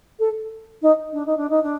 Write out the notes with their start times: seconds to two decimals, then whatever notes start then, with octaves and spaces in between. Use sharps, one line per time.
0.19 A4
0.82 D#4
1.12 D4
1.26 D#4
1.37 D4
1.49 D#4
1.63 D4